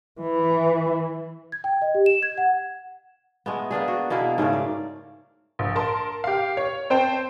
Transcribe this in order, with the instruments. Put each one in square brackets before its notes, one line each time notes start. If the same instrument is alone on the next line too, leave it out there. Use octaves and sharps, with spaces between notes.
[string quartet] E3
[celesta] G#6
G5
D#5
G4
E7
G#6
F#5
[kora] G#3 A3 B3
A#3 B3 D4 G#4
F#4
B2 A#3 E4 G#4
G#2 C#3 A3 A#4
D5
[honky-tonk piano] A#1
A#4 A5 C6
G4 F5
C#5
C4 C5 G5 A5